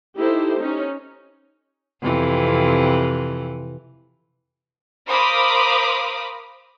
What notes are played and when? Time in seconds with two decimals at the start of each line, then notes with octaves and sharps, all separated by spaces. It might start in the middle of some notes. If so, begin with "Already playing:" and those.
0.17 D#4 E4 G4 A4 C5
0.57 C#4 D#4
2.02 F2 C3 E3
5.07 A#4 C5 F5 B5 D6 D#6